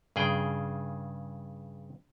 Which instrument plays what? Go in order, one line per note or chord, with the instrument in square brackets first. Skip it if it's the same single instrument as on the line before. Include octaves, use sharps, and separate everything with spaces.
[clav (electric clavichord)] G2 C#3 G#4 G5